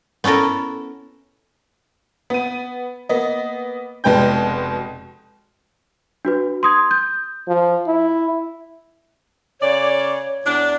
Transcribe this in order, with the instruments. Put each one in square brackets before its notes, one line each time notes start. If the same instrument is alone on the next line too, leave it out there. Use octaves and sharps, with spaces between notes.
[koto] B3 C#4 E4 A4 A#4
[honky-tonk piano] B3 D#7
A#3 B3 D#5
F1 B2 G#3 B4 G5 G6
[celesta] D4 F#4 B4
C6 D#6 G#6
G6
[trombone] F3
E4
[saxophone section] C#3 D5 [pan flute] C#5
[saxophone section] E2 D4